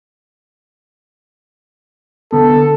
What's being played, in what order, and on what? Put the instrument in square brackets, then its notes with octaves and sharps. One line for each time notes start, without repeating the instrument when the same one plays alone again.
[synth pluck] D3 B3 [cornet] A4